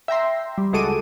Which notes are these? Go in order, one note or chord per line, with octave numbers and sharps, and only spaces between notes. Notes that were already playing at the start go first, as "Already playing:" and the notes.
E5 G5 A#5 C6
G3
C#2 G#3 F#4 A4 D6 D#7